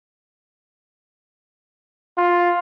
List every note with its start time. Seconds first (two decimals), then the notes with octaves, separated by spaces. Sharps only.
2.18 F4